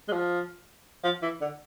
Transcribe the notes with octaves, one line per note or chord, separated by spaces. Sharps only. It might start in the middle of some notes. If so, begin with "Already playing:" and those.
G#3
F3
F3
E3
D3